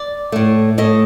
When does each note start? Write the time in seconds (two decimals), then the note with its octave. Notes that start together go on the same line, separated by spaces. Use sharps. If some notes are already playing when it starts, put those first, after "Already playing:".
Already playing: D5
0.32 A2 A3
0.78 A2 A3 D#5